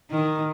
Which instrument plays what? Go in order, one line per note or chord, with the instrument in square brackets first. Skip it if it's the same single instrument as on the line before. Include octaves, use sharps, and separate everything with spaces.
[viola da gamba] D#3